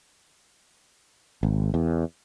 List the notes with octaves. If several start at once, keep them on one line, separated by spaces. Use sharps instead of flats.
G#1
E2